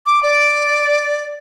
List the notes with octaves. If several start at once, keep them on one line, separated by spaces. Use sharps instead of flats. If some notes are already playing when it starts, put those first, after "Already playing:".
D6
D5